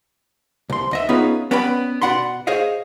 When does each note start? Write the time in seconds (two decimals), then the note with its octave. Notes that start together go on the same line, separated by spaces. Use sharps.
0.70 C2 C6
0.91 D2 D#5 E5
1.09 B3 C#4 D#4 F4 G#4 B4
1.51 B3 C#4 B4 D5 G5 B5
2.02 B2 F#4 D5 F#5 B5 C6
2.47 G#4 C5 C#5 D#5 F5